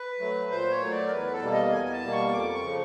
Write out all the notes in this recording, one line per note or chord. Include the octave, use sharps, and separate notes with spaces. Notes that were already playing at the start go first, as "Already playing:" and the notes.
Already playing: B4
F#3 A3
A#2 C5
C#5
F#3 A3
D5
A#4
E2 B4
A4
B2 G3 A#3
D#5
E2 G#5
G#5
A5
B2 G3 A#3
C#6
F2 D6
C#6
C#3 F3